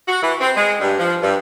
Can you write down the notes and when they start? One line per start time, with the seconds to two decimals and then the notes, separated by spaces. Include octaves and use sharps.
0.08 F#4
0.23 E3
0.41 C4
0.57 G#3
0.80 G2
0.99 F3
1.23 G2